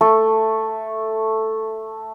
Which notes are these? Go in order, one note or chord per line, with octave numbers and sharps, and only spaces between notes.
A3 A4